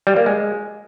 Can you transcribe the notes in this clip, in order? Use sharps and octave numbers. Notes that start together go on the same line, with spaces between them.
G3
A#3
G#3